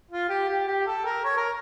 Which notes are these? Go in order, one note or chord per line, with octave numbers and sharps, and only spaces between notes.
F4
G4
G4
G4
A4
A#4
C#5
A#4